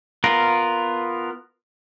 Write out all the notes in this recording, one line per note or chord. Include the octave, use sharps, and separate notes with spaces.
B3 F4 A#4